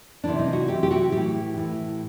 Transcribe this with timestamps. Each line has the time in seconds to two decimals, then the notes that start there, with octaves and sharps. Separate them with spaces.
0.24 C3 E3 D4
0.39 D#4
0.53 F#4
0.68 C3 E3 G4
0.83 G4
0.91 F#4
1.12 A2 E3 G4
1.57 A2 E3